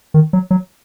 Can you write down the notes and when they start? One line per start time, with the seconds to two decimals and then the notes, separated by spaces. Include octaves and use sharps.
0.14 D#3
0.33 F#3
0.51 F#3